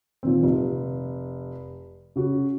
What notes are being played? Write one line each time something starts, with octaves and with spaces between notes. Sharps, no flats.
A#2 D#3 C4
F1
C#3 F#4